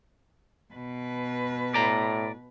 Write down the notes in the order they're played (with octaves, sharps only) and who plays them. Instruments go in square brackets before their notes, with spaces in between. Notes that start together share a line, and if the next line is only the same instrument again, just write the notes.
[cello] B2 B4
[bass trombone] A2 [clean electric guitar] D5 A#5